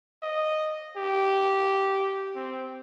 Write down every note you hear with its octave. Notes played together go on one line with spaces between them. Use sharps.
D#5
G4
C4